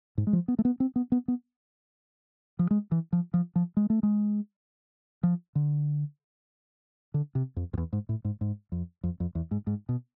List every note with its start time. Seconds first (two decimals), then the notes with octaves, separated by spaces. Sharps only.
0.18 G#2
0.27 G#3
0.33 F3
0.48 B3
0.59 A3
0.65 B3
0.80 C4
0.96 B3
1.12 B3
1.28 B3
2.59 F3
2.71 G#3
2.92 E3
3.13 F3
3.34 F3
3.56 F3
3.77 G#3
3.90 A3
4.03 G#3
5.23 F3
5.55 D3
7.14 D3
7.35 C3
7.56 F2
7.73 F2
7.78 E2
7.93 G#2
8.09 A2
8.25 G#2
8.41 G#2
8.72 F2
9.04 F2
9.20 F2
9.35 E2
9.51 G#2
9.67 G#2
9.89 B2